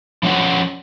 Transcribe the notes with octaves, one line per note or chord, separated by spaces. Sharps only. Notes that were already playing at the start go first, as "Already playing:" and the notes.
F3 C#4 C#5 D5 F#5